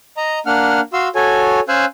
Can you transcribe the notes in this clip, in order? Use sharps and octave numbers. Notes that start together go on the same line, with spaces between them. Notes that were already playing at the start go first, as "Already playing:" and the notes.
D#5 A#5
A#3 D4 F#5 F6
F#4 F5 C6 E6
F#4 A4 C#5 G#5
C#4 C5 F5 G#5 E6 F#6